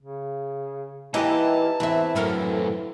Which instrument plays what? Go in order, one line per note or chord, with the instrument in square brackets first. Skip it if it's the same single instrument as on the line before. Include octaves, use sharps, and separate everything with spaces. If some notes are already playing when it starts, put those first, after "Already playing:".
[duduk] C#3
[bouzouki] E3 A#3 [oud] D#4 G4 [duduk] E4 [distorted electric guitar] A5
[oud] E2 E5 [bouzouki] E3 C4 [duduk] E4
[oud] F#2 A4 A#4 [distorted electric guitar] A2 F#3